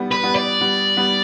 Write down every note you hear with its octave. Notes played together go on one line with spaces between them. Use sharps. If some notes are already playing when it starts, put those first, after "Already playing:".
Already playing: G3 B3
B4
G3 B3
D5
G3 B3
G3 B3